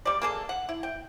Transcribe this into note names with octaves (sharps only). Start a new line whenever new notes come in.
G3 D5
A#3 G#4 A4
F#5
E4
G5